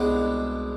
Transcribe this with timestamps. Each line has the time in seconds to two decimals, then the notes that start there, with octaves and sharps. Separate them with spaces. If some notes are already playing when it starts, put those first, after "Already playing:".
Already playing: C2 B2 G#3 B3 D4